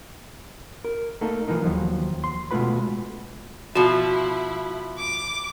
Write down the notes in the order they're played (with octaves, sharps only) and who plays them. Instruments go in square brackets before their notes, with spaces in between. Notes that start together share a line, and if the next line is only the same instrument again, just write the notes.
[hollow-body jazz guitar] A#4
A3 A#3 D#4 A4
E3 F3 A#3 D#4
D#2 F3 F#3
C6
B2 G#3 A3 F4 B4 B5
[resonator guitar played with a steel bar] B2 F3 [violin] E4 [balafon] F#4
[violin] D6